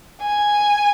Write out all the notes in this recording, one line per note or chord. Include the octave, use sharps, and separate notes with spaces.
G#5